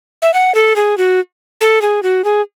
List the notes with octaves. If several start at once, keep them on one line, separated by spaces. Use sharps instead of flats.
E5
F#5
A4
G#4
F#4
A4
G#4
F#4
G#4